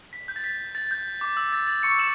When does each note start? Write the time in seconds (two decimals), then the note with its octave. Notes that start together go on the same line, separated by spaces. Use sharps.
0.13 B6
0.28 G6
0.36 A6
0.44 B6
0.75 A6
0.91 G6
1.21 D6
1.37 E6
1.53 A6
1.68 A6
1.83 C#6 C#7
1.99 E6 E7